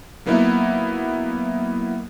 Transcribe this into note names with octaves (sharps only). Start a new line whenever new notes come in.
F#3 A#3 B3 D#4 E4